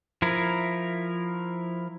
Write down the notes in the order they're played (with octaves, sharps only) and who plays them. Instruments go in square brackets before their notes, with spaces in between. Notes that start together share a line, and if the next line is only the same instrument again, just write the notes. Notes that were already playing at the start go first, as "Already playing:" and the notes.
[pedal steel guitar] F3 E4 A#4